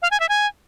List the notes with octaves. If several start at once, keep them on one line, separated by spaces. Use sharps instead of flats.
F5
G#5
E5
G#5